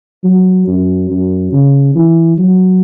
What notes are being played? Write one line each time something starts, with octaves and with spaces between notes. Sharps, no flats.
F#3
F#2
F#2
C#3
E3
F#3